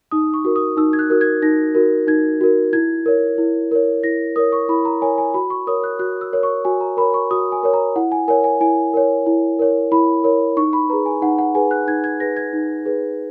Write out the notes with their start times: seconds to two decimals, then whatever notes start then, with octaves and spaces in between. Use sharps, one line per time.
0.11 D#4 D#6
0.34 C#6
0.45 F#4 A#4
0.56 D#6
0.77 D#4 E6
0.93 G#6
0.99 F#6
1.10 F#4 A#4
1.21 G#6
1.42 D#4 A#6
1.75 F#4 A#4
2.07 D#4 G#6
2.41 F#4 A#4
2.73 E4 G#6
3.06 A#4 C#5
3.38 E4
3.71 A#4 C#5
4.04 E4 A#6
4.36 A#4 C#5 D#6
4.52 C#6
4.69 E4 B5
4.85 A#5
5.02 A#4 C#5 G#5
5.18 G#5
5.34 F#4 B5
5.50 C#6
5.67 A#4 C#5 D#6
5.84 F#6
5.99 F#4 F#6
6.21 E6
6.33 A#4 C#5
6.43 C#6
6.65 F#4 G#5
6.81 A#5
6.97 A#4 C#5 B5
7.14 C#6
7.31 F#4 D#6
7.52 G#5
7.63 A#4 C#5
7.74 A#5
7.96 E4 F#5
8.12 G#5
8.28 A#4 C#5 G#5
8.44 G#5
8.60 E4 G#5
8.94 A#4 C#5
9.26 E4
9.59 A#4 C#5
9.92 E4 B5
10.24 A#4 C#5
10.57 D#4 C#6
10.73 B5
10.90 G#4 B4 A#5
11.06 G#5
11.22 D#4 F#5
11.38 F#5
11.55 G#4 B4 G#5
11.71 F#6
11.87 D#4 G#6
12.04 G#6
12.20 G#4 B4 A#6
12.37 G#6
12.53 D#4
12.85 G#4 B4